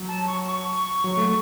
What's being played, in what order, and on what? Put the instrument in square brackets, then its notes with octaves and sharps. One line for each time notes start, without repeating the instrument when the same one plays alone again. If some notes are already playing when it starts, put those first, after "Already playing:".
Already playing: [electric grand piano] F#3
[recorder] A5
C#6
C#6
[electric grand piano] F#3
A3